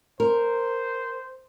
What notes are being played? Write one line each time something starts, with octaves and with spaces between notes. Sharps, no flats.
A#4 C5